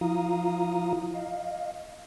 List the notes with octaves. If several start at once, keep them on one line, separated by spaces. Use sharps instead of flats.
F3 E4 F4 F5 A#5 D#6
D#5 F5